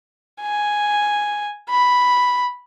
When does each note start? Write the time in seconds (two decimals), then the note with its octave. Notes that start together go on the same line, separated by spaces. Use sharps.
0.42 G#5
1.70 B5